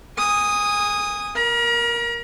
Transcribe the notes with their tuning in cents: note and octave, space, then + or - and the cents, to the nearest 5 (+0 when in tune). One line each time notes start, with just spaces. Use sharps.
G#5 -20 D#6 +0
A#4 +10 A#5 +45